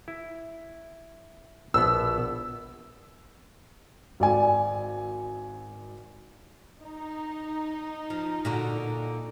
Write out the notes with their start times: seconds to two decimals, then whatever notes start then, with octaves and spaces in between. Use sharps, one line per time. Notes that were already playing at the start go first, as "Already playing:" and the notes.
0.08 E4
1.74 A#1 B2 B3 E6
4.20 G#1 D5 G#5
6.82 D#4
8.10 F3
8.45 A#2 D3 F#4